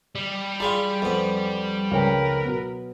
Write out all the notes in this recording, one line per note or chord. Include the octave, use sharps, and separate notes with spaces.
G3
F4 G#4 D5 B5
F2 B3
C#2 A#4 B4 C#5 G5
B2 F#3 B3